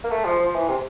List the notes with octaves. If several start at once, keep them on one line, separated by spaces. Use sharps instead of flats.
A#3
A3
F3
F3
E3
C3